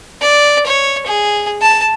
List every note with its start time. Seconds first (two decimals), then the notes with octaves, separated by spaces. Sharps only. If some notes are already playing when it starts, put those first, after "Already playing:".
0.22 D5
0.66 C#5
1.06 G#4
1.61 A5